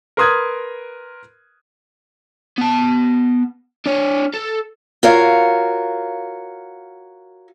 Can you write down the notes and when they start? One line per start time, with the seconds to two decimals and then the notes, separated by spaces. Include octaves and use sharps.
0.17 A#4 B4 C6 D#6 F#6 G#6
2.58 B3 A5
3.86 D4 C#5
4.34 A4
5.03 F4 F#4 A#4 C#5 F5